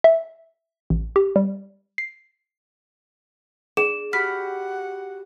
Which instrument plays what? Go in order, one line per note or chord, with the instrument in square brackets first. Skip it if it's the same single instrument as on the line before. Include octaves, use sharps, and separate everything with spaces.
[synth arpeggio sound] E5
A1
G4
G3
C7
[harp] D4 [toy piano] G#4 [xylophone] E7
[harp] F#4 G4 B5 [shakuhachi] F#5 [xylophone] F6 B6